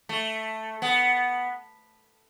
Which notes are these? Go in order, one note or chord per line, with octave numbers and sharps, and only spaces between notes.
A3
B3